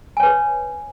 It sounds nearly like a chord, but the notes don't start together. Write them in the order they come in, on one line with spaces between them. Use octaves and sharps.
G#5 C#5 B4